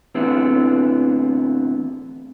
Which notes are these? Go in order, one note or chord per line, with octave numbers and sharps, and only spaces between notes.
A2 D3 E3 B3 C4